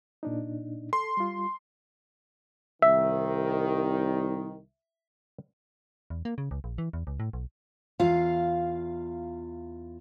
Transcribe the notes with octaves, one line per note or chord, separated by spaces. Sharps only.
A#2 D4 D#4
A4 C6
G3 F4
C2 D#3 E5
E2
A#3
C#3
C#2
A#1
E3
E2
C#2
A2
B1
E2 F4 F5